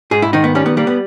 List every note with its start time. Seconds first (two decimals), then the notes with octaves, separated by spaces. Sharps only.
0.11 G#2 G#4
0.22 E4
0.33 D#3 D#4
0.44 B3
0.55 G3 C#4
0.66 B3
0.77 G3 A#3
0.87 B3